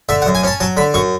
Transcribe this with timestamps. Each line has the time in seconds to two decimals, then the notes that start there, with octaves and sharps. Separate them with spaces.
0.09 D3 E5
0.22 F#5
0.26 F#2
0.35 G#5
0.43 C#4 A5
0.60 F#3 A5
0.77 D3 B5
0.94 F#2 C#6